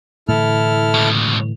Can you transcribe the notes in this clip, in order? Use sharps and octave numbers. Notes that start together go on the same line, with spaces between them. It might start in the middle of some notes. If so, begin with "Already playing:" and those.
A2 D3 E3 E4 A4 F6
C#2 B2